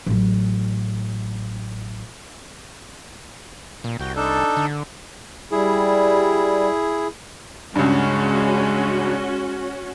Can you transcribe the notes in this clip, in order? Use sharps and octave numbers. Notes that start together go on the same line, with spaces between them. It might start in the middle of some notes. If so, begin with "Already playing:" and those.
A1 F#3
A#2
C2 F#4 G5
D4 D#4 A4
D3
G3 E4 G#4
C#2 G2 G#3 C#4 F#4